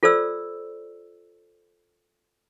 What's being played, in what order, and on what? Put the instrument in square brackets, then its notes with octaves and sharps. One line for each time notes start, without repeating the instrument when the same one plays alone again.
[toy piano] F4 A4 C5 D5 E6